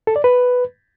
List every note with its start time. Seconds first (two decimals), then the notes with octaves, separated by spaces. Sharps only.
0.07 A4
0.16 D5
0.24 B4